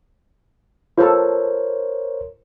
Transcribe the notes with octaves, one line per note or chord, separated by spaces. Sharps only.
F4 A4 A#4 C5 C#5